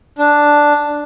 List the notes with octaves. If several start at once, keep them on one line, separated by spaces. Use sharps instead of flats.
D4